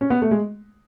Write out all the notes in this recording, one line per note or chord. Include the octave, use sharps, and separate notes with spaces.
C#4
B3
A3
G#3